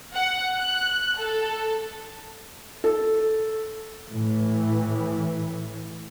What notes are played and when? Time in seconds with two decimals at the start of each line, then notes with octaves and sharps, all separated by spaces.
0.14 F#5
0.59 F#6
1.17 A4
2.84 A4
4.11 A2 E3